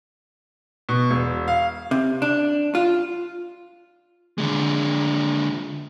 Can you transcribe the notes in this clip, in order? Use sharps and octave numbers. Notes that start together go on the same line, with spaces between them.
B2
E1
F5
C3
D4
F4
D3 G#3